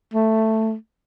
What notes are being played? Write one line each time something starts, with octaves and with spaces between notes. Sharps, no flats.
A3